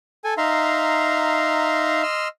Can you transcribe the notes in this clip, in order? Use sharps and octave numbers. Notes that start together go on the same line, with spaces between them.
A4 G#5
D#4 E5 F5 A#5 C6
D#5 C6 E6 F6